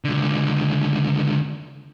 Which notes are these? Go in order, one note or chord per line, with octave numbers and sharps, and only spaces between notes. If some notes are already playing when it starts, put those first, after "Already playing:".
C#2 D3